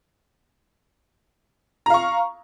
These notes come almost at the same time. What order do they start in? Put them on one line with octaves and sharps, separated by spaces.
A#5 F5 C#6